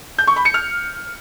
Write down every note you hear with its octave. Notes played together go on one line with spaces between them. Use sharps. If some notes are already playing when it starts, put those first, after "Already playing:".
G6
C#6
B5
C#7
F6